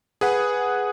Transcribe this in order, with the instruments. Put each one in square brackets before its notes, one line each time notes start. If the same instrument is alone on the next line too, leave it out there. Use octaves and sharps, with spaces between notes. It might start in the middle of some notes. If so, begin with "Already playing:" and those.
[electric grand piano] G#4 B4 F#5